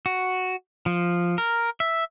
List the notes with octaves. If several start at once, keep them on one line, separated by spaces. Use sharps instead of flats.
F#4
F3
A#4
E5